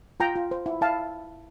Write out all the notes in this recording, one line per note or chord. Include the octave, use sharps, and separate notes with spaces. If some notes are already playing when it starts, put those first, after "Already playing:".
F4 G5 A#5
F4
C5
E4
E4 F5 A5